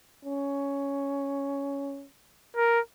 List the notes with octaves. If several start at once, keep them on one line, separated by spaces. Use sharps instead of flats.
C#4
A#4